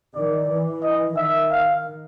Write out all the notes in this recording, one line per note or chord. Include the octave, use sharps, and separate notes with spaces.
D#3 D5
E3
D#5
D#3 E5
F5